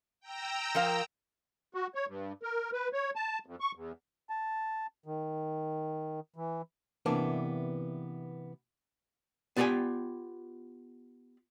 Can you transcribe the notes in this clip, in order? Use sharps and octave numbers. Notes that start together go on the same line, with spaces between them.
G5 A#5 E6
F3 A#4 F5
F#4
C#5
G2
A#4
B4
C#5
A5
F2
C#6
E2
A5
D#3
E3
C3 E3 A#3 B3 D4
B3 F4 G4 D5 G5 G#5